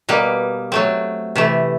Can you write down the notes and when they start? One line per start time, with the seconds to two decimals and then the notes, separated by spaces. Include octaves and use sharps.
0.09 B2 G3 A#3
0.72 F#3 A3 C4
1.36 C3 E3 A3